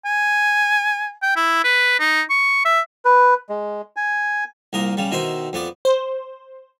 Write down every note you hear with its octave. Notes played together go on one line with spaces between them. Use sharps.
G#5
G5
E4
B4
D#4
C#6
E5
B4
G#3
G#5
C2 A#2 A#4 D#6
C#3 G3
B2 D#3 E4 C5 E5
F2 B3 D5
C5